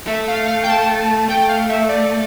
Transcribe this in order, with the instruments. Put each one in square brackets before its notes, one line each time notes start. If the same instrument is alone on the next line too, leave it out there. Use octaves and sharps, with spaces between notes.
[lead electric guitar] A3 [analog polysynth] E5
[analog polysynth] F5
F5
G5
A5
[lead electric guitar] A3 [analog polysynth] G5
[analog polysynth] F5
E5
D5